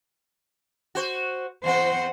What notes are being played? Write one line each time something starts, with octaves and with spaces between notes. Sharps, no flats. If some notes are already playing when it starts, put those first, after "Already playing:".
F#4 C5
E2 C4 C5 F#5